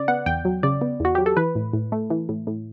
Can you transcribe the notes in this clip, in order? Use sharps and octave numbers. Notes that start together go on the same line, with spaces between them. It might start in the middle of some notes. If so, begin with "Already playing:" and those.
Already playing: C#3 D5
B3 F#5
E2 G5
F#3
C#3 D5
B3
E2 F#4
F#3 G4
A4
E3 B4
A2
A2
A3
E3
A2
A2